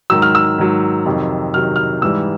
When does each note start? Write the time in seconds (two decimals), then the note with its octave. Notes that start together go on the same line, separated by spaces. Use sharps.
0.10 G#2 D#3 F#3 E6
0.22 F6
0.35 E6
0.58 G#2 D#3 F#3
1.06 F2 C3 D#3 F#3
1.54 F2 C3 D#3 F#3 F6
1.76 F6
2.02 G#2 E3 G3 E6